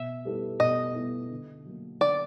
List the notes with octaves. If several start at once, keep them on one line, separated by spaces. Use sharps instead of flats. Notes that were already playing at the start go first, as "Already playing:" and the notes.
Already playing: B2 E5
G3 B3 E4 A4
B2 D#5
G3 B3 E4 A4
D3
F#3 A#3
D3 D5